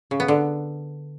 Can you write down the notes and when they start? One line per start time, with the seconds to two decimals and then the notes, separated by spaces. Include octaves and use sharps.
0.11 C#3
0.20 B3
0.28 D3